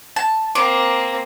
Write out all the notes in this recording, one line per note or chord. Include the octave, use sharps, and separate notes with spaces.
A5
A#3 C4 D6